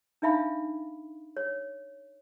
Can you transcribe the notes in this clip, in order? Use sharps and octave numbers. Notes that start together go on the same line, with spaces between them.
D4 D#4 E5 F5 B5
C#5